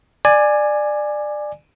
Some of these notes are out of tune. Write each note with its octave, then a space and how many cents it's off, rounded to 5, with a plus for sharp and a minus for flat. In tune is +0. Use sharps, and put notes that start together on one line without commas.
D5 +20 G#5 +0